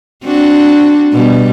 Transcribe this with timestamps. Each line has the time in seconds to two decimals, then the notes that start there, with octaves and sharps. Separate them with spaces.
0.24 C4 D4 F#4
1.11 B2 G3